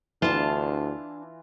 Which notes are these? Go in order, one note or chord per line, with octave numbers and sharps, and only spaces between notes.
D2 E3 D4 F4 A5